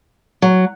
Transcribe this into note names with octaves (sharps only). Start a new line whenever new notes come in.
F#3